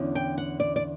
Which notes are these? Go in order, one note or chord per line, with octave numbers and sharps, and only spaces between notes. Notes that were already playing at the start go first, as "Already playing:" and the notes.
Already playing: E2 D3 C#4
G5
F#5
D5
D5